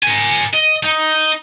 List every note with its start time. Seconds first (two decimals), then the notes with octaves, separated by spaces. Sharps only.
0.03 A#4 G#5
0.54 D#5
0.83 D#4